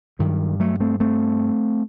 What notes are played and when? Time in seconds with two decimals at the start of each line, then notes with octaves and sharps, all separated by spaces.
0.19 G2 D#3 F#3
0.60 F#3 A3
0.80 A3 C4
1.00 A3 C4